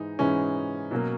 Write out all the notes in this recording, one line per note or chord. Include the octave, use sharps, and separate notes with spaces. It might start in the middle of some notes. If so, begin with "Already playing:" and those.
Already playing: G#2 E3 G#3 D#4
G#2 E3 G#3 C#4
B2 F#3 A#3